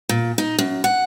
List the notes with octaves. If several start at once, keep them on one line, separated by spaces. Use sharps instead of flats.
A#2
D#4
F#2
F#5